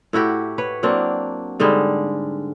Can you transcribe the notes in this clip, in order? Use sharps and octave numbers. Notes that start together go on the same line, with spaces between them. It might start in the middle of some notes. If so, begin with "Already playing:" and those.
A2 E4 F#4 G4
B4 C#5
F#3 A#3 C4 D4
G#2 D3 G3 G#3